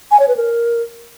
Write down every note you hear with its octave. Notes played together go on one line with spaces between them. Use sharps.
G#5
C#5
B4
A#4